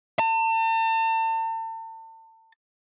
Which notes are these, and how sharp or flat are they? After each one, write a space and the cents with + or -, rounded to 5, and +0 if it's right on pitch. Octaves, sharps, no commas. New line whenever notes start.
A5 +40